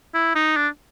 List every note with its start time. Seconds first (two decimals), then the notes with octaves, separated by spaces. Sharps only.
0.14 E4
0.35 D#4
0.57 D4